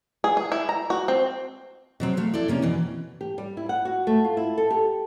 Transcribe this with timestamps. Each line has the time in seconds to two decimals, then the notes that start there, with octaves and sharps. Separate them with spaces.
0.24 G#4
0.37 G#4
0.52 E4
0.69 A#5
0.90 F#4
1.08 C4
2.00 B2 F#3 C4
2.17 A3 F5
2.34 E4 A4 D5
2.48 C3 A#3 C#4
2.62 B2 E3
3.21 G4
3.38 G3
3.57 E4
3.69 F#5
3.85 F#4
4.07 A3
4.25 F4
4.37 E4
4.58 A4
4.71 G4